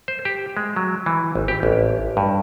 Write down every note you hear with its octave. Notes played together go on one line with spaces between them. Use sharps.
C5
G4
G#3
F#3
E3
G#1
G4
A1
G2